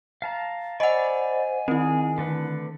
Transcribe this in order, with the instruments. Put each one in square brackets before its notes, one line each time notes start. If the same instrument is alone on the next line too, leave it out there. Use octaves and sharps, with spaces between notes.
[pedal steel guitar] F5 A5 A#5
[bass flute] C5 [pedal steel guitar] D5 B5 C#6 [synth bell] D#5 F#5 [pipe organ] G#5
[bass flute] D#3 [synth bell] C4 E4 [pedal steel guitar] G#4
[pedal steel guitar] D3 A3 B4